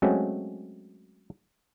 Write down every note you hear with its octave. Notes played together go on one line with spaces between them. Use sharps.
F#3 G#3 A3 C4 C#4 F#4